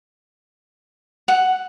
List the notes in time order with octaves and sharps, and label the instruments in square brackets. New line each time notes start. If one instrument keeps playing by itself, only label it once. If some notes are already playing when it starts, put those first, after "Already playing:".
[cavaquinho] F#5